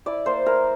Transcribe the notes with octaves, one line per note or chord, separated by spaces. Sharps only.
E4 D5
A#3 C5
E4 A#4